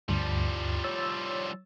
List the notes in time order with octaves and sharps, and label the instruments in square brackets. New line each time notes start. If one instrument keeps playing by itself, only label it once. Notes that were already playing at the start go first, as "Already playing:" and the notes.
[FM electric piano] D2 G2 [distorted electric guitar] F3 G3
[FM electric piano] C#5 E6 A6